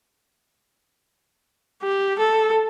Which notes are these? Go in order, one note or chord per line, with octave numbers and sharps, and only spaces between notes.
G4
A4